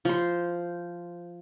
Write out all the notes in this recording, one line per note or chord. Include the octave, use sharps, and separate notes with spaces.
F3 C5